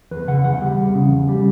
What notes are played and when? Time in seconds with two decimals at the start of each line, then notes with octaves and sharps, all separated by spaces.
0.11 E2 B4
0.28 C#3 F#5
0.44 E2 F#5
0.61 G3
0.79 E2
0.95 C#3
1.11 E2
1.28 G3